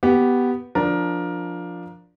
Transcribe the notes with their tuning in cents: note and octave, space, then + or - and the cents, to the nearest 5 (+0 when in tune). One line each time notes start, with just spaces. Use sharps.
B3 +0 G4 -5
F3 +10 D4 +0 A#4 +15